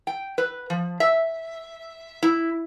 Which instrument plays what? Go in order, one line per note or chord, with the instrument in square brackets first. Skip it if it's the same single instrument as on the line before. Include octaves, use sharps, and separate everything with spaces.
[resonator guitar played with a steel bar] G5
B4
F3
E5
E4